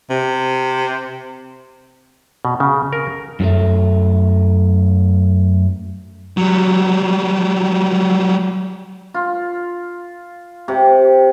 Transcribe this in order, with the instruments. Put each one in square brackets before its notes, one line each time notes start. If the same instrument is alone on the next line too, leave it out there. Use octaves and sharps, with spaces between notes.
[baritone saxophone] C3
[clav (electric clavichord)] B2
C#3
A#4
[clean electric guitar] F#2 F#3 A3
[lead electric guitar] F#3 G3
[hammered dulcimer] F4
C3